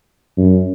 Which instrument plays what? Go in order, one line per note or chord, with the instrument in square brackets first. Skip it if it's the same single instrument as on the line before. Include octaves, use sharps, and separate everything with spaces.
[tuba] F#2